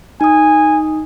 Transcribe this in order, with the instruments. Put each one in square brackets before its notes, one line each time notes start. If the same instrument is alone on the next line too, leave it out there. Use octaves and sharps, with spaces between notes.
[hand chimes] D#4 D#6 [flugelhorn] G#5